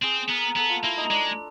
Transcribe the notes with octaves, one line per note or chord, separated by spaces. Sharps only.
C4 G#4
B3 A#4
B3 A4
F4
A#3 E4
D#4
G#3 D4